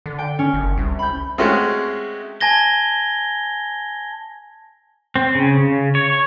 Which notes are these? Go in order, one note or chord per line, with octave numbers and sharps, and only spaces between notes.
D3
G5
C#4
F#1
C2
B5 G6
G#3 A3 C4 C#4 F#4 G4
G#5 A5 G#6 A#6 G7
C4
C#3
C#3
C#5